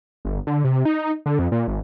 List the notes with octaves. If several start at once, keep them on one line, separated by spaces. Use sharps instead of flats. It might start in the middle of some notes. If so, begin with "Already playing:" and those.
G1
D3
C3
D#4
D3
F2
A#2
G#1